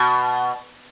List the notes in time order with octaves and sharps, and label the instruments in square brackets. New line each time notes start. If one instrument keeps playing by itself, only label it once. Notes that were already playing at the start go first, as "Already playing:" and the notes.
Already playing: [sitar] B2